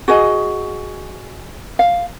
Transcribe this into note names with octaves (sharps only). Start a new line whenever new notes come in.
F#4 G#4 D#5
F5